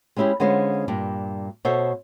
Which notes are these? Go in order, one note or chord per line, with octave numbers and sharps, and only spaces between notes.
G#3 C#4 D4 E4 G4 G#4
D3 G#3 B3 C#4 F4 C5
G2 A#2 G3 D4
B2 A4 C5 C#5 E5